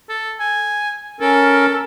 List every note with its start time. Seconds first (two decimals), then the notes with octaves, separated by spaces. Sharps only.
0.09 A4
0.39 G#5
1.21 C#4 A4 A#4